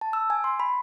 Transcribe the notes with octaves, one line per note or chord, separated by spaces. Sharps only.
A5
E6
G#5
C6
B5